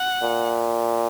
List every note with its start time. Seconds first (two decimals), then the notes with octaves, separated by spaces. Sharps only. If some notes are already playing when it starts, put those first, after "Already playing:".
Already playing: F#5
0.23 A#2